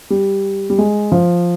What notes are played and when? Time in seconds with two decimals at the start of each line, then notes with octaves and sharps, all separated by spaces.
0.10 G3
0.70 G3
0.78 G#3
1.12 F3